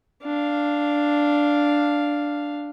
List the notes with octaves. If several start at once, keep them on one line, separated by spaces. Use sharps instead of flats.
D4 F5